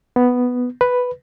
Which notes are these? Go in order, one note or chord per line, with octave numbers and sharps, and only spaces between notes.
B3
B4